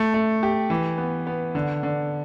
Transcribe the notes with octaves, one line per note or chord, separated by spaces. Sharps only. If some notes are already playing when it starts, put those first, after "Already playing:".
Already playing: A3
A3
G4
E3
B3
B3
D3
D3